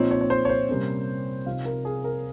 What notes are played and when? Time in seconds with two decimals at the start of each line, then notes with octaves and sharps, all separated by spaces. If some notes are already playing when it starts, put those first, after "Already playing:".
Already playing: A#2 F3 C4 D#4 C#5
0.11 C#5
0.21 C#5
0.30 C5
0.45 C#5
0.49 C5
0.69 C3 G3 A#3 C#4
1.46 C3 F3 C4 D#4 F5
1.65 A#4
1.85 G#4
2.04 A#4